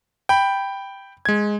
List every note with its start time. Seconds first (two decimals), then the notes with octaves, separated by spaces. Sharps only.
0.29 G5 B5
1.25 G#3 G#6